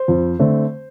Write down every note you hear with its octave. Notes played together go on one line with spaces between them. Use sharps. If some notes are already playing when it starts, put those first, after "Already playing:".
Already playing: C5
F2
D3 A3 C4